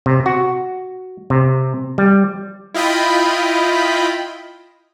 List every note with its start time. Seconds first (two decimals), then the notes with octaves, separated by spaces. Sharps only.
0.06 C3
0.26 F#4
1.30 C3
1.98 G3
2.74 E4 F4 D#5 G5 B5